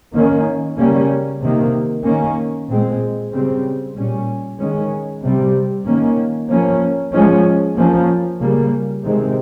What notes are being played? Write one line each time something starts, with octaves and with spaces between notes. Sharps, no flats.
D#3 A#3 C#4
C#3 G3 A#3 C#4
C3 D#3 A#3
D#3 A#3 C#4
A#2 G#3 C4
C#3 G3 C4
A#2 G3 C#4
D#3 G#3 C#4
C3 G3 C4
D#3 A#3 C#4
F3 A#3 C#4
F3 G#3 C#4
F3 A#3 C#4
C#3 G3 A#3
C3 D#3 G#3 C4